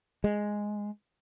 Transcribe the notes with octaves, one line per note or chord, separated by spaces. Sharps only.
G#3